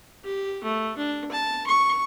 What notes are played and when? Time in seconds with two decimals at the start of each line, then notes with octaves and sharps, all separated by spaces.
0.24 G4
0.64 A3
0.97 D4
1.32 A5
1.67 C#6